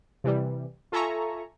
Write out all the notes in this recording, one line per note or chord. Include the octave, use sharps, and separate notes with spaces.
C3 E3 G3
F4 A4 E5 G#5 A#5 C#6